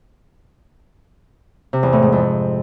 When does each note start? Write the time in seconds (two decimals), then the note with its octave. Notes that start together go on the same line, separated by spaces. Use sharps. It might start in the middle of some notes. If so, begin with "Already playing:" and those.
1.73 C3
1.83 E2
1.93 A2
2.03 G#2
2.12 F2